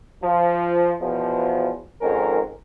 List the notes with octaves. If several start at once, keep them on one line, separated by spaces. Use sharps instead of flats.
F3
E2 B2 F3
F2 G#2 D#3 C#4 A#4